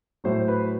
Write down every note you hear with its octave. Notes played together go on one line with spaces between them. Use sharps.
A2 F#3 C5
B4